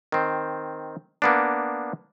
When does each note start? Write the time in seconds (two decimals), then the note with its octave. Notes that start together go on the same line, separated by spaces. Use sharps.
0.12 D#3 C4
1.22 A#3 B3 D4